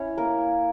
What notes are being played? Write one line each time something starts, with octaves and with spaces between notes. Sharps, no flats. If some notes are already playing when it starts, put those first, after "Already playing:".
Already playing: C#4 E4 C#5
A#3 A#4